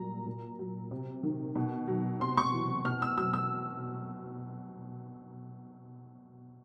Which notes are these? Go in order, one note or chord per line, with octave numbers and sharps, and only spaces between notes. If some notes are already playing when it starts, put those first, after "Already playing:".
Already playing: A#2 F#3 G3 A#5
A#2
F#3
C3
D#3
B2
F#3
C3 C6
C#6
E3
B2 F6
E6
F#3 E6
E6